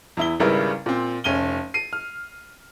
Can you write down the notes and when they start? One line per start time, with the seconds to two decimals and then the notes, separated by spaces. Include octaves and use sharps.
0.17 E2 E4 G7
0.40 G#1 C#3 G3 E4 A#4 B4
0.86 A#2 C4
1.24 F1 C#4 D#7 G7
1.74 C7 D#7
1.93 F6